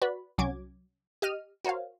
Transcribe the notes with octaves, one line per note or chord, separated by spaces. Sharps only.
F#4 B4 D5 B5
C2 F#3 C#4 D6 G#6
G4 D#5 F6 D#7
F#4 A#4 C5 C#5 F5